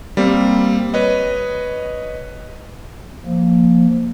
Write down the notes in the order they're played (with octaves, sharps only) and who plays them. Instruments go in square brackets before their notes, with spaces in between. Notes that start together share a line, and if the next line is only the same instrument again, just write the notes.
[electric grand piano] G3 A#3 C4
B4 C#5 D#5
[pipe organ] F3 A#3